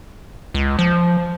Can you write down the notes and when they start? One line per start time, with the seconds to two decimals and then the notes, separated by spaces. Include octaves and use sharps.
0.55 C#2
0.79 F3